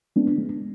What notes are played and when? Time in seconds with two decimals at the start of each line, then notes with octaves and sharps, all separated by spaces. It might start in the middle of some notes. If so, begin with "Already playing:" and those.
0.16 G#3 B3 D4
0.38 G#3